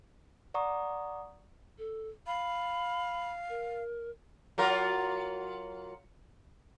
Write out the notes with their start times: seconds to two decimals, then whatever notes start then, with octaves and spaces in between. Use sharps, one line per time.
0.54 D5 F#5 A#5 C#6 D#6
1.78 A4
2.27 F5 B5
3.49 A#4
4.58 F#3 F4 A#4